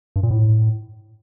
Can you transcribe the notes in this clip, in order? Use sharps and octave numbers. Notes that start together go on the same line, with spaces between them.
G2
A#2
A2